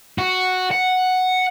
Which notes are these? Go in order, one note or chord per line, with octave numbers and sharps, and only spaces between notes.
F#4
F#5